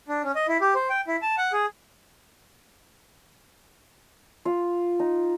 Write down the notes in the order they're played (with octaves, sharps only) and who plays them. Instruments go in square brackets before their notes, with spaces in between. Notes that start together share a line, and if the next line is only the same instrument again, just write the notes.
[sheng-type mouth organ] D4
C#4
D#5
E4
G4
C5
G5
E4
A5
F#5
G#4
[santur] F4
D#4